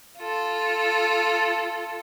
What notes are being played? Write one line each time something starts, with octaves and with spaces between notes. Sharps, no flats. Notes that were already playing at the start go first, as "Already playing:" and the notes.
F4 A4